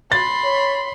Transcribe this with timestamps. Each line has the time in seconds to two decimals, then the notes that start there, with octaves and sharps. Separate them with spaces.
0.12 B5 C6 A6
0.44 C#5